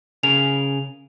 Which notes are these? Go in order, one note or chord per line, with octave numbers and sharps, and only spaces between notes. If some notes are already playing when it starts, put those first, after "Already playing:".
C#3 G#4 A#4 F7